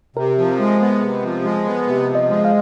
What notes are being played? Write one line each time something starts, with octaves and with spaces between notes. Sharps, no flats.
C3 A#4
F3
G#3
B3
C3
F3
G#3
B3
C3
F3
D#5
G#3
F5